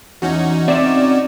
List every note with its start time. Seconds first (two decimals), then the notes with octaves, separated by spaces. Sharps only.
0.22 E2 C#4 D#4 F#4
0.68 C4 D5 E5 E7